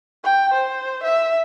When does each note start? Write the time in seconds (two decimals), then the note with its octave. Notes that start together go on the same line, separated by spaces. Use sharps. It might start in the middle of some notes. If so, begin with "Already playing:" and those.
0.24 G5
0.53 C5
1.03 E5